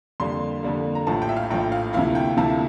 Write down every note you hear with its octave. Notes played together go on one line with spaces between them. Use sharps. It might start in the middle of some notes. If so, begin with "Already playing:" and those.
F2 D3 G3 A#3 C6
F2 D3 G3 A#3
A#5
A#1 A2 F3 A5
G5
E5
F5
A#1 A2 F3 G5
F5
D2 C3 F3 A#3 E4 F5
G5
D2 C3 F3 A#3 E4 A5